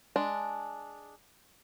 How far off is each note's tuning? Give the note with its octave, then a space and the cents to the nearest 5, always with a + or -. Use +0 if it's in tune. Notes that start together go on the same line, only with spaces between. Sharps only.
G#3 +0 D4 +0